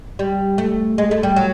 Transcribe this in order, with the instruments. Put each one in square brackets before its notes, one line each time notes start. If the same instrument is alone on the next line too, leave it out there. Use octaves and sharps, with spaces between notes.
[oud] G3
A3
G#3
A3
G3
F#3